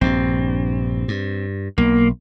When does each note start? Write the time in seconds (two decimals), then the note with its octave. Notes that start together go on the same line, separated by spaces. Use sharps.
0.01 A#1 G2 C4
1.08 G2
1.78 B1 A#3